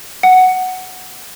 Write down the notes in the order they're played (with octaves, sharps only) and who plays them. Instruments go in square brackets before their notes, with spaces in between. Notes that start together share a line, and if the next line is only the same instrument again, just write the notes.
[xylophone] F#5